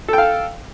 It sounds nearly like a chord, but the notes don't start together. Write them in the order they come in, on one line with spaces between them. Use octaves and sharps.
A4 G5 F5